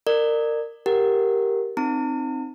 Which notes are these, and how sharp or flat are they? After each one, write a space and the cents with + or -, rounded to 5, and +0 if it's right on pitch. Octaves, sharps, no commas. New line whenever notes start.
A#4 -20 D5 +30
G4 +0 A#4 +0 F#5 +0
C4 +0 D#4 -20 A#5 -45